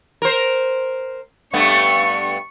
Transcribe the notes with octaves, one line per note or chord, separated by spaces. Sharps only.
A#4 C5
G2 A3 B3 C#6